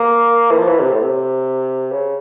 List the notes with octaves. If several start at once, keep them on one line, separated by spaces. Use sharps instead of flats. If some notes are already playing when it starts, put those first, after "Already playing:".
Already playing: A#3
E3
F3
E3
C3
A2
C3
C#3